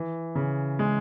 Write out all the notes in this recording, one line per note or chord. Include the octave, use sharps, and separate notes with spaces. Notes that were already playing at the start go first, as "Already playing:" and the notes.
Already playing: E3
C#3
G#3